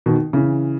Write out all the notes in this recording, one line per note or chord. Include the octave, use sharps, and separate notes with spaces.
B2 D#3
C#3 E3